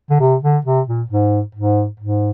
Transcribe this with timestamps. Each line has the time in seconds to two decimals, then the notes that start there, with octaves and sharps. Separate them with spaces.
0.10 D3
0.20 C3
0.42 D3
0.65 C3
0.87 A#2
1.10 G#2
1.55 G#2
2.00 G#2